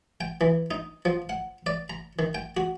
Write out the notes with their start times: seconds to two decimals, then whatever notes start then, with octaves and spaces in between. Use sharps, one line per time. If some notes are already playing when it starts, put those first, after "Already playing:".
0.21 G5
0.41 E3
0.71 D#4
1.05 F3
1.29 F#5
1.66 D5
1.90 A#5
2.19 D#3
2.35 G5
2.57 F#4